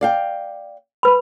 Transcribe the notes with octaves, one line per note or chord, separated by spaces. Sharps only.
D5 F5 G5
B4 B5